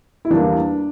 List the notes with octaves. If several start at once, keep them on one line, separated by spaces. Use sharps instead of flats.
E4
E2 D3 G3 A#3 D4